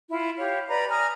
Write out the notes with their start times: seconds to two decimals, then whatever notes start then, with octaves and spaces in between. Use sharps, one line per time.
0.10 E4 F4
0.38 G4 C#5 F5
0.67 B4 D5 A#5 B5
0.89 G#5 A#5 D#6 F6